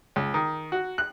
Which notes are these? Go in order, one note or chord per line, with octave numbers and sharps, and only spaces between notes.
C#2
D#3
F#4
F#6